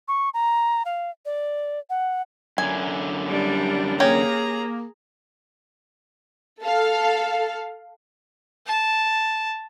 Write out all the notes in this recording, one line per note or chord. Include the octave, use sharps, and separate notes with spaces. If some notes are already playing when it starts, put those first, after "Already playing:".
C#6
A#5
F5
D5
F#5
F#2 D3 G#5
G3 D4
A#3 C#4 G4 G#4 A#5
A4 F5
A5